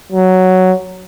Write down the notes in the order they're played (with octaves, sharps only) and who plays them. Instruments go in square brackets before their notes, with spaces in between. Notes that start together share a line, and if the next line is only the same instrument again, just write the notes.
[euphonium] F#3